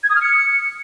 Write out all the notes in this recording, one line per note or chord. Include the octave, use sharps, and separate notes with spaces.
G#6
D#6
F6
C#7